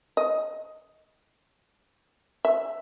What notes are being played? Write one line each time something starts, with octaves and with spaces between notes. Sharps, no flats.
D#5
E5